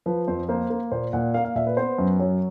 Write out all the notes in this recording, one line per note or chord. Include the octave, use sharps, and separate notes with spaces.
F3 B4
F2 C5
A#3 C5
A#3
A#2 C5
A#2 F#5
A#3 F5
F5
A#2 E5
B4
B3 C5
F#2
F#3 C#5